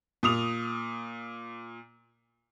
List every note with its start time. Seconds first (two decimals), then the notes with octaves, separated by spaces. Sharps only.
0.23 A#2 D#6 F7